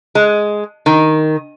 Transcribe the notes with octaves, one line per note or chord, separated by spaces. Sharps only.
G#3
D#3